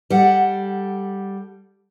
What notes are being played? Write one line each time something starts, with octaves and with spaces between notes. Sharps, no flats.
G3 A4 F#5